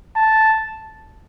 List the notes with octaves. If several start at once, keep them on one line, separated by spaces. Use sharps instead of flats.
A5